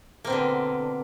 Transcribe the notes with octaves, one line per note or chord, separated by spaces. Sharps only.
B2 D3 A#3 C4